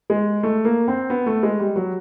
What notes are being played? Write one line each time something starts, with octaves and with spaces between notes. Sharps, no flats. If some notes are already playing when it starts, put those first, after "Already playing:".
G#3
A3
A#3
C4
B3
A3
G#3
G3
F#3